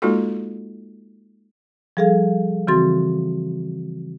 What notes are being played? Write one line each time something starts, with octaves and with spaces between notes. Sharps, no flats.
G#3 A#3 D#4 F4 F#4 A4
F3 G3 G#4 A4 F5
C#3 E3 C4 F#4 C6 A6